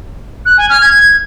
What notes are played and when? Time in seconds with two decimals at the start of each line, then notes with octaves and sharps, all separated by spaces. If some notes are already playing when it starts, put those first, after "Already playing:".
0.46 F#6
0.57 G#5
0.69 F6
0.81 G#6